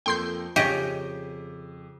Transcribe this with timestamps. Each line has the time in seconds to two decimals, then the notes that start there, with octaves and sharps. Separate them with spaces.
0.06 F2 A#3 A4 G5 C6 G6
0.56 F2 C#3 G4 D#5 C#6 D6 D#7